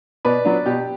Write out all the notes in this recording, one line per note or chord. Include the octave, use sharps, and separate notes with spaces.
B2 B4 D5
F#3 B3 D4
B2 G4